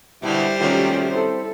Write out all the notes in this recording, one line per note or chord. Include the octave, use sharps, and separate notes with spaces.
B2 D3 G3 E4 C5
D#2 C3 D#3 F#3 A3 C#4 F4 G4
C4 E4 A4 C5